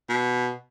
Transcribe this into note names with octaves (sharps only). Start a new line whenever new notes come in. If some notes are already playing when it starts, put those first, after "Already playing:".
B2